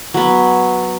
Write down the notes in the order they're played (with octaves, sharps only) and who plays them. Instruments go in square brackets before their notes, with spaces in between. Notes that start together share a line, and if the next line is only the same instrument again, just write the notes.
[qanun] F#3 B3